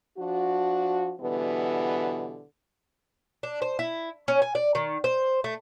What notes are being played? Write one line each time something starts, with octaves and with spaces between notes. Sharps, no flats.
F3 D4 F#4
B2 D3 E3 G3 B3
D4
C5
E4
C#4
G#5
D5
D#3
C5
A3